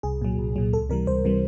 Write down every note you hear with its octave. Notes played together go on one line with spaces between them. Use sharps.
C2 G#4
A#2 F#3
C2
A#2 F#3
C#2 A4
C3 E3 G3 A#4
C#2 C5
C3 E3 G3